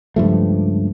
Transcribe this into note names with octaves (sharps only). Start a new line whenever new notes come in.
C#2 G2 F3 A3